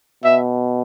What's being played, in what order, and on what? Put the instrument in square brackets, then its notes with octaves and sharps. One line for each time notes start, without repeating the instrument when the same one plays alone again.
[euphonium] B2 [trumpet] E5